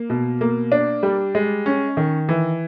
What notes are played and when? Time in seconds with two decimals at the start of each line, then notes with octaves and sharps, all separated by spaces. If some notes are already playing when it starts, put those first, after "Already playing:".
Already playing: A#3
0.10 B2
0.41 A#3
0.72 D4
1.03 G3
1.35 G#3
1.66 C#4
1.97 D#3
2.29 E3